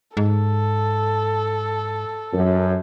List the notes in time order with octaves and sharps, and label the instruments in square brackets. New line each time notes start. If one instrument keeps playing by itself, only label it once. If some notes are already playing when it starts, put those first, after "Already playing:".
[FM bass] G#2 [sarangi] A4
[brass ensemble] F#2